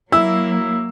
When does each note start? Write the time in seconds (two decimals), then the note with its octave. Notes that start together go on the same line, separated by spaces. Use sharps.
0.12 F#3 A#3 E4 E6